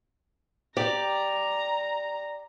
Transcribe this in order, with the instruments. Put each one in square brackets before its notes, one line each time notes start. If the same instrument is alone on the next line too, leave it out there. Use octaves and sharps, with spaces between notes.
[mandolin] G4 [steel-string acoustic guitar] D5 [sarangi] A#5